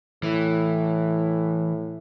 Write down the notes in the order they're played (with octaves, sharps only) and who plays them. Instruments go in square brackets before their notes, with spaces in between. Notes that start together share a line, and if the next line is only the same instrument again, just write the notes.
[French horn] A2 [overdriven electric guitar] E3